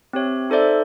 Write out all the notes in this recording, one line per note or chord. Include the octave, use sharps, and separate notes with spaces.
C4 G4 C#5 E5
D#4 A4 C5 D5 E5